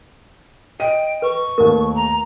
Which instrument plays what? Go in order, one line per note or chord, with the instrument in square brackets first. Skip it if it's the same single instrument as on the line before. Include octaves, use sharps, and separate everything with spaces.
[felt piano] D#5 D#7 [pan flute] G5
[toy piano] B4 [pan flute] C#6
[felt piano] D#2 A3 [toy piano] A#4
[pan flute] A#5